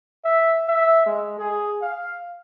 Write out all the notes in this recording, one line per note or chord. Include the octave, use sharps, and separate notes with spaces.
E5
E5
G#3
G#4
F5